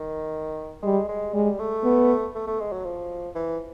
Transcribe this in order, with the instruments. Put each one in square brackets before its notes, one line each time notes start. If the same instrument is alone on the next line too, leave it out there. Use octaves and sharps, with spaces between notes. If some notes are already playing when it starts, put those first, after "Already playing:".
Already playing: [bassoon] D#3
[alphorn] G3 [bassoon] G#3
[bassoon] G#3
[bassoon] G3 [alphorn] G#3
[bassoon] A3
[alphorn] B3
[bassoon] A3
A3
G#3
F#3
F3
E3